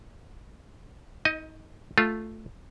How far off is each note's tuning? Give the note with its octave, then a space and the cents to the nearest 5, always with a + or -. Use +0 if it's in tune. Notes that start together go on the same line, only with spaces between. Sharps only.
D#4 +30 D#5 +0
A3 +0 F4 +0